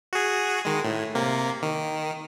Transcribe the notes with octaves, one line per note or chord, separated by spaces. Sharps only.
F#4 G#4
D#3 G#3
A2
C3 A#3
D#3